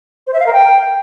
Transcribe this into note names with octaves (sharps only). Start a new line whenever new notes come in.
C5
E5
F5
A#4
G5